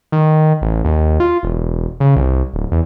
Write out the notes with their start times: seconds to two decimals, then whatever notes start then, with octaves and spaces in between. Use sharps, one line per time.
0.12 D#3
0.61 A1
0.85 D#2
1.20 F4
1.43 E1
2.00 C#3
2.16 C2
2.54 D1
2.72 E2